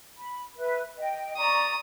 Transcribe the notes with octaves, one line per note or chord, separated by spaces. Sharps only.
B5
B4 E5
D#5 G5
D5 A#5 C#6 D#6